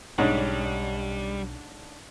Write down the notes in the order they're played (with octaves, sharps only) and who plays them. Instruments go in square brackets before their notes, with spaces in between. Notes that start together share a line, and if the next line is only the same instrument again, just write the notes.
[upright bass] B1 [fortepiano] G#2 [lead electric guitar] G3 [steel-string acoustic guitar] C#4 D4